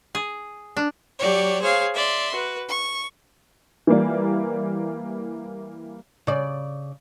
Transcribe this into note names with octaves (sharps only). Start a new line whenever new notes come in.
G#4
D4
F#3 G4 C#5 D5
G#4 C5 C#5 F5
D5 E5 C6
F#4 B4
C#6
E3 G3 A#3 D5
C#3 D5